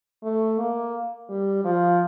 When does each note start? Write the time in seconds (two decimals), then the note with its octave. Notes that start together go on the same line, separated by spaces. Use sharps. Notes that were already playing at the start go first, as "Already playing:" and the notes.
0.23 A3
0.59 A#3
1.29 G3
1.65 F3